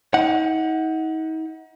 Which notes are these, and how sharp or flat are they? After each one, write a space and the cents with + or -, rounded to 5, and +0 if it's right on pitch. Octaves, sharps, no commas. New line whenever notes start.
D#4 +40 F#5 +0